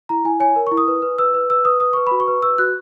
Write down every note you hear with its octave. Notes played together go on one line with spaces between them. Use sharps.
E4 A#5
E4 G#5
C#5 G#5
A#4
E4 C#6
D#6
B4
B4
B4 E6
B4
B4 E6
B4 D#6
B4 D#6
B4 C#6
F#4 B5
C#6
B4
B4 E6
F#4 F#6